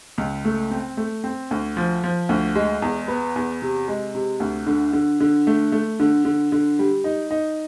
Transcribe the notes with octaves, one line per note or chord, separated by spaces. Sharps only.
C#2
A3
C4
A3
C4
D2
F3
F3
D2
G#3
E2
B3
E2
C3
G#3
C3
D2
D3
D3
D3
A3
A3
D3
D3
D3
G3
D#4
D#4